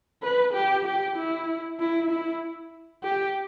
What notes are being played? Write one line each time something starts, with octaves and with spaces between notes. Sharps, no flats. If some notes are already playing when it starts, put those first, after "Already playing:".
B4
G4
G4
E4
E4
E4
G4